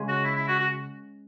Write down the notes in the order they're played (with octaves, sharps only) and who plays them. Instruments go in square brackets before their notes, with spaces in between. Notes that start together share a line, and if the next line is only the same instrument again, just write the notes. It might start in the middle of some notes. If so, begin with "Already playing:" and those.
Already playing: [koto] C#3 G#3 C#4 G#4
[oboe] F#4
E4
E4
F#4
F#4